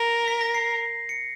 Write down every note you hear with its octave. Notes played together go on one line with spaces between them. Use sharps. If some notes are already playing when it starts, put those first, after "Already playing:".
Already playing: A#4
B6
A#6
C7
C#7